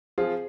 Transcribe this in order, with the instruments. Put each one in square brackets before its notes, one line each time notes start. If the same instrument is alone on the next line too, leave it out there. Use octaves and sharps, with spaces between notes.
[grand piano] F3 C4 F4 [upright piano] G#4